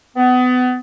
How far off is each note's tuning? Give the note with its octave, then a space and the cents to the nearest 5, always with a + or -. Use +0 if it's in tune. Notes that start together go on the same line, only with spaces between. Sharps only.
B3 +30